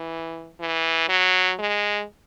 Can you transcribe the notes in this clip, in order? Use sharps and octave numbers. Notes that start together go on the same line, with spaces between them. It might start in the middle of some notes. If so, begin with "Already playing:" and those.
Already playing: E3
E3
F#3
G#3